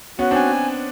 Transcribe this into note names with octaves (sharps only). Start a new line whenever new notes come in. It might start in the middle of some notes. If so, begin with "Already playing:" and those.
B3 C#4 F#4
C4 D4 G#5